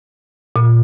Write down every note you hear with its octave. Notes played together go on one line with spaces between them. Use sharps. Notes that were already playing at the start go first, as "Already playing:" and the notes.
A#2